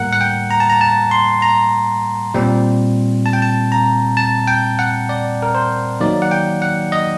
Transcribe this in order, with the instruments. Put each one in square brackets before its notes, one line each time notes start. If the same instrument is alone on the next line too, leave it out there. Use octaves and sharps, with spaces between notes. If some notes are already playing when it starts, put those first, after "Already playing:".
Already playing: [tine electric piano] A2 G3 A#3 A#4 F#5
F#5
G5
A#5
A5
A#5
A5
C6
A#5
A#2 G3 C4
A5
G5
A5
A#5
A5
G5
F#5
D5
A#4
C5
D#3 F#3 A#3 D#4 D5
F#5
G5
F#5
D#5